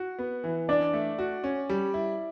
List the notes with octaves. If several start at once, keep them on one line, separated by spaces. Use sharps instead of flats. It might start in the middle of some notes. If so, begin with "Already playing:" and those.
Already playing: F#4
B3
E3
D4 D5
A3
F#4
C#4
G3
E4